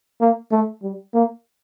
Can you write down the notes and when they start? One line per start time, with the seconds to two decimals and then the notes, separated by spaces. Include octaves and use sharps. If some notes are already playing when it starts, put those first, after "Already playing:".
0.21 A#3
0.51 A3
0.83 G3
1.14 A#3